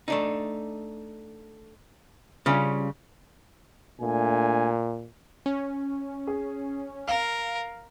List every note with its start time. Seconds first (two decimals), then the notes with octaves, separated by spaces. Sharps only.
0.08 A3 D4 D#4
2.46 C#3 G3 C#4 F4
4.01 A#2 A3 D4 G#5
5.46 C#4
6.27 G#4
7.08 A#4 F5